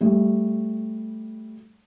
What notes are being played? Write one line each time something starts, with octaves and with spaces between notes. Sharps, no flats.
G3 A3